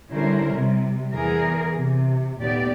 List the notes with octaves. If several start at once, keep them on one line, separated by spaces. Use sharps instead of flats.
D3 G3 C#4 E4 A#4 C5
C3 G3
E2 E3 G#4 A#4
C3
D#2 A#2 A3 B3 G4 D5